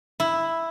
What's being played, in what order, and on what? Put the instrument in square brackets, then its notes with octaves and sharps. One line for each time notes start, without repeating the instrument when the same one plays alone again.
[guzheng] E4